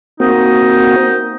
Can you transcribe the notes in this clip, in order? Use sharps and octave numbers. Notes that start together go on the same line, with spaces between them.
A#3 C4 D#4 F#4